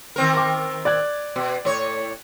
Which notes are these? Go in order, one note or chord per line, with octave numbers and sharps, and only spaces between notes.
D#3 C4 A#4
D6
D5 F#6 G#6
B2
A2 C#5